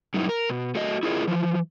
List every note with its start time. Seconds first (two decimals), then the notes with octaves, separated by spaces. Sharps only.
0.14 G2 F#3 D#4 E4
0.29 A#4
0.49 B2
0.75 A3 F#4 D#5
1.03 E4 F4 G#4 A#4 D#5
1.28 E3 F3